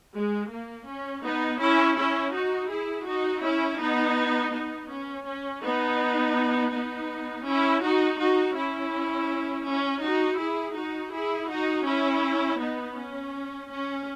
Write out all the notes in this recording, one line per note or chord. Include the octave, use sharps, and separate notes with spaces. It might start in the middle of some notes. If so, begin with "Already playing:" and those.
G#3
A#3
C#4
B3 D#4
C#4 E4
C#4 E4
D#4 F#4
E4 G#4
D#4 F#4
C#4 E4
B3 D#4
B3 D#4
C#4
C#4
B3 D#4
B3 D#4
C#4 E4
D#4 F#4
D#4 F#4
C#4 E4
C#4
D#4 F#4
E4 G#4
D#4 F#4
E4 G#4
D#4 F#4
C#4 E4
B3 D#4
C#4
C#4